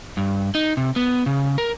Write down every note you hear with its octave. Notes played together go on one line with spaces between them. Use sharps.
G2
D#4
C3
B3
C#3
A#4